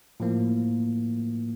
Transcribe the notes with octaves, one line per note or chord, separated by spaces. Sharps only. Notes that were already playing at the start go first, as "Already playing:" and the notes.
A2 F3 A#3